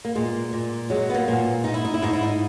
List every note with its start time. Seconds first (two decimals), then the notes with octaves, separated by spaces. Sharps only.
0.05 A#3
0.15 A#2 G#3
0.53 A#2
0.90 F#3 G#3
1.10 B3
1.14 A#3
1.28 A#2
1.64 G#2 D#4
1.74 E4
1.85 D#4
1.94 E4
2.02 G#2 D#4
2.13 E4
2.23 D#4